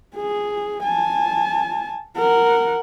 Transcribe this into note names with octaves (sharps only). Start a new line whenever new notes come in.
G#4
G#5 A5
A#4 F#5